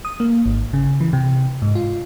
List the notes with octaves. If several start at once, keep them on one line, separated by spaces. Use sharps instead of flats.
D#6
A#3
G#1
C#3
E3
C3
G#2
F4